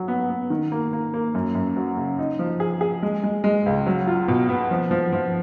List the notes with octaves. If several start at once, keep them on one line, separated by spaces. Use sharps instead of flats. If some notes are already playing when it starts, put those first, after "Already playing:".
Already playing: F#3
B3
B3
D#3
A#3
A#3
A#3
F#2
F#2
F#3
C#3
D#4
F3
G#4
G#4
G#3
G#3
G#3
C#2
F#3
F4
B2
B3
F3
F3
F3